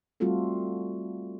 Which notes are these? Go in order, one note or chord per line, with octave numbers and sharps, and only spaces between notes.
G3 A3 C4 F4 F#4 A4